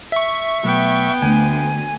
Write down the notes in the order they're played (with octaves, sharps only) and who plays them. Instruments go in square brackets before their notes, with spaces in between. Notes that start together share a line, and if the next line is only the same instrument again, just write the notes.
[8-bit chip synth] E5 C#6
[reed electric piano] B2 F#3 A3 [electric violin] B3 G5
[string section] D2 [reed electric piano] D3 [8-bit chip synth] G#5